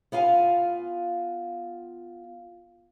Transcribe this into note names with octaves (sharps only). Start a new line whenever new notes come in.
B3 F4 F5 G#5